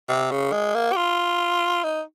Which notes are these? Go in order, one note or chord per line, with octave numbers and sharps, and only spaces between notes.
C3
C#3
G#3
A#3
G4
F4
D#4